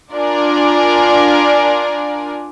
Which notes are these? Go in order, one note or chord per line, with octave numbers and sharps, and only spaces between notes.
D4 F4 A#4 D5 G#5